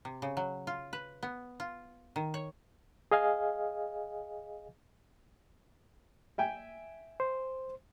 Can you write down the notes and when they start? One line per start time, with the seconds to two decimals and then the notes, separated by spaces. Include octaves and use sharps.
0.05 C3
0.22 C#3
0.37 F#3
0.67 F4
0.93 B4
1.23 B3
1.60 F4
2.16 D#3
2.34 C#5
3.11 G#4 D#5 F5 G#5
6.38 E5 G5 G#5
7.20 C5